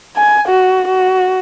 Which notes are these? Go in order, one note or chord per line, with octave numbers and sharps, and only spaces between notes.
G#5
F#4
F#4